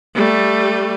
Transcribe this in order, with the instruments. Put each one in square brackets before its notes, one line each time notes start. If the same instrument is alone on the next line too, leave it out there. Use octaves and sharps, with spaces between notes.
[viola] G3 A3